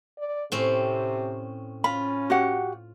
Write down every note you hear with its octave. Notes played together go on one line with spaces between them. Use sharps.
D5
A2 C3 C4 C#4
C#4 F4 B5
F#4 G4 F#5